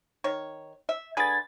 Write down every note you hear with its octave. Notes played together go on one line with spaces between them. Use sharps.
D#3 C#5
E5
D3 G#4 B4 G#6 A6